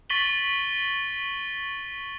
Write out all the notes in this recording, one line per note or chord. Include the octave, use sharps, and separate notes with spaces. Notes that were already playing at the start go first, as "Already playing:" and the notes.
C#6 A6 B6 D#7 F#7 G7